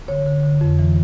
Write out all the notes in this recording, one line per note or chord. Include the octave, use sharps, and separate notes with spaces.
D3 C#5
D3
D3
F2
E3